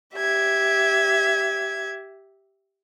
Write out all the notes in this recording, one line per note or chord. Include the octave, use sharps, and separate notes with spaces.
G4 E5 G#6